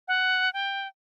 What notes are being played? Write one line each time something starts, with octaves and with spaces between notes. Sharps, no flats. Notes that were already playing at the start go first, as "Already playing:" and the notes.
F#5
G5